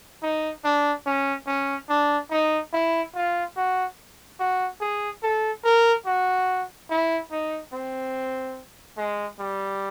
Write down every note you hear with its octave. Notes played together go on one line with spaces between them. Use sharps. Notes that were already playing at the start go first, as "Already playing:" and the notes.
D#4
D4
C#4
C#4
D4
D#4
E4
F4
F#4
F#4
G#4
A4
A#4
F#4
E4
D#4
C4
G#3
G3